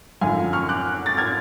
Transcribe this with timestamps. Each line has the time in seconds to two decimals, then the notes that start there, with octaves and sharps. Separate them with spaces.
0.21 F#2 D3 F3 F5 G#5
0.53 C#6 F6
0.69 D6 F#6
1.06 A6
1.17 F6 G#6